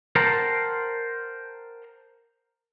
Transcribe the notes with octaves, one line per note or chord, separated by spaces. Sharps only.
A#4 C5 F#5 G5 A5 A#5